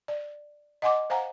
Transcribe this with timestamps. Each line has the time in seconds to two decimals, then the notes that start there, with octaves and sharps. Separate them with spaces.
0.08 D5
0.82 D#5 F#5 G#5 C6 D6
1.10 C5 F5 F#5 G#5 A#5